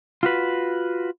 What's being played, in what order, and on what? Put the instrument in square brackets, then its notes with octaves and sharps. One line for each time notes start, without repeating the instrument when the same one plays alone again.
[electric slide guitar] F4 F#4 B4